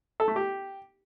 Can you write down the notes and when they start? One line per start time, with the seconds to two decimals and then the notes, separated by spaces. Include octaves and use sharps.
0.20 A4
0.28 A3
0.36 G4